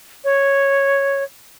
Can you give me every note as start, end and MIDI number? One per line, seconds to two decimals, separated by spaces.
0.25 1.24 73